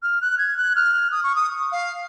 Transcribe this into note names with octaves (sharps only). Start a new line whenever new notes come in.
F6
F#6
G#6
F#6
F6
D#6
C#6
D#6
F5